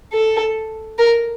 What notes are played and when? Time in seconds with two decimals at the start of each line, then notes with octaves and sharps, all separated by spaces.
0.13 A4
0.98 A#4